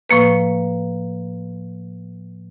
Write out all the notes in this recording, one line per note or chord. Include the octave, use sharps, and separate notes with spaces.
A2 F3 A#3 B4